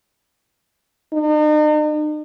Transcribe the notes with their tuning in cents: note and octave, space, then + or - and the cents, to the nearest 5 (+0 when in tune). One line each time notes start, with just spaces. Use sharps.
D#4 -45